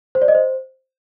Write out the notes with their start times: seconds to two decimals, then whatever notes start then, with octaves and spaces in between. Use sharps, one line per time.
0.15 C5
0.22 D5
0.28 D#5
0.35 C5